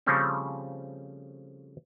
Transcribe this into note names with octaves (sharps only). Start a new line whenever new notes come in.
C#3 F3 G3 A3 C4 C#4